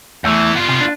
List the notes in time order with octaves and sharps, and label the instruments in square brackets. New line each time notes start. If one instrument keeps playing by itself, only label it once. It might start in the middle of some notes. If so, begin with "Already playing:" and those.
[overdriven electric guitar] E2 E3 [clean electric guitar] A3 E5
[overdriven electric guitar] B3 F4
[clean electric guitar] C3
D4